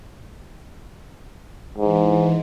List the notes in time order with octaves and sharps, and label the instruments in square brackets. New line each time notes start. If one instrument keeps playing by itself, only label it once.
[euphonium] G#2 [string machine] E3